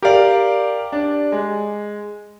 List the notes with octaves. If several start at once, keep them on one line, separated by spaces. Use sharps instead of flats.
G4 A#4 D5 F5
D4
G#3